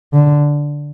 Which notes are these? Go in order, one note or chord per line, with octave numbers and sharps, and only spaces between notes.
D3